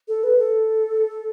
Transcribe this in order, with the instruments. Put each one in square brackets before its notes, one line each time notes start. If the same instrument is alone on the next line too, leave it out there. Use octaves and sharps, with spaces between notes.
[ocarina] A4
B4
A4